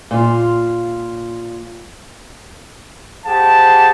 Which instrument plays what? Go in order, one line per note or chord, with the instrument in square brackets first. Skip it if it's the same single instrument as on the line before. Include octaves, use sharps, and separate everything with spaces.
[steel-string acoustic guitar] A#2 F4
[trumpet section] G4 G#4 C5 F#5 A5